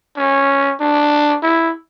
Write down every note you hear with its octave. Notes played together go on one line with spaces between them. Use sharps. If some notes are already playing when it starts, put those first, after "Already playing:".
C#4
D4
E4